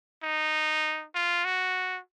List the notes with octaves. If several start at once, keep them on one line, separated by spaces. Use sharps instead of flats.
D#4
F4
F#4